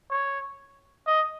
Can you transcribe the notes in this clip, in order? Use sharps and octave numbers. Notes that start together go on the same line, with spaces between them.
C#5
D#5